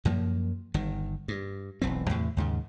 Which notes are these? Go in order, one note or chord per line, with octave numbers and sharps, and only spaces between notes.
F#2 F3 A#3
G1 D#3
G2
E1 B1 E3 C4
E2 A2 C3
D#2 G#2 C#3